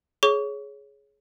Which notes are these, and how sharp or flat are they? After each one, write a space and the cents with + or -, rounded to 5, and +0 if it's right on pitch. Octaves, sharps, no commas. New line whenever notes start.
G#4 +15 C#5 +0 C#6 +30